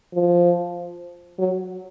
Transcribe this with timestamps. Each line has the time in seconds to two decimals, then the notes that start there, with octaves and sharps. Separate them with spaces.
0.14 F3
1.39 F#3